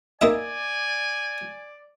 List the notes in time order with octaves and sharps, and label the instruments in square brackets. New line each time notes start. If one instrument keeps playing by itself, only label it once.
[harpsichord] A#3 D#4 E5 [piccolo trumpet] D5 [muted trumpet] G#5